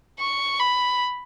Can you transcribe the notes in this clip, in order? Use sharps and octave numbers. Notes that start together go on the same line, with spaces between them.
C#6
B5